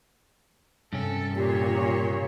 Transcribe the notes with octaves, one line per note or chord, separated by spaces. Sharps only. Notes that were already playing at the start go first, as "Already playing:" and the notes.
G2 C3 C#4 A4
A#2 G4 C#5